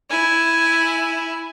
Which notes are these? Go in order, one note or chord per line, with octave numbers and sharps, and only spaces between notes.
E4 G#5